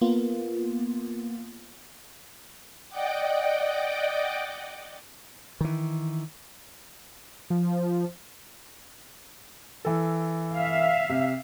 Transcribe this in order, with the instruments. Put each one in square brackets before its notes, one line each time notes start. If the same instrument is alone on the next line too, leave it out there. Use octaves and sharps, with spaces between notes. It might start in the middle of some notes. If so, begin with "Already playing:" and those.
[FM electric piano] A#3 B3 F4
[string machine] D5 D#5 F#5 G5 D6
[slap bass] D#3 E3
[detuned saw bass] F3
[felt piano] E3 A4
[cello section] E5 F5
[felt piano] C3